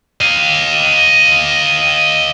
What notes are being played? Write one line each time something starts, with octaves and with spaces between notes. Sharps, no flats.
D#5 F5